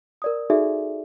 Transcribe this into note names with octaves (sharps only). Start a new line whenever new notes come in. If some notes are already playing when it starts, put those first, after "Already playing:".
A#4 D5 D#6
D#4 F#4 G#4 A4 D5 E5